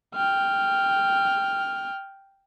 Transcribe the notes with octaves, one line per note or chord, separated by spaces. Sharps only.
G5 F6